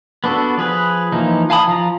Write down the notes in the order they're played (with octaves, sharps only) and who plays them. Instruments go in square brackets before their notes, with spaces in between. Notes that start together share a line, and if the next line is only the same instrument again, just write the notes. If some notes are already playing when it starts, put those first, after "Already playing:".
[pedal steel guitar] B3 D4 F#4 A4
F3 G#4 B4
E3 F3 A#3 D#4
F5 G#5 A5 B5 D#6
F3 F4 A#5